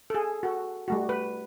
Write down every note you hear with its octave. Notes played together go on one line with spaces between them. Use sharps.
G#4 A4
F#4 A4
G3 A3 F#4
B4